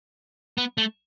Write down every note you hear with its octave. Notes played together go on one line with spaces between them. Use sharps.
B3
A3